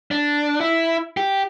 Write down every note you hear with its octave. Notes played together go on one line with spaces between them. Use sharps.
D4
E4
G4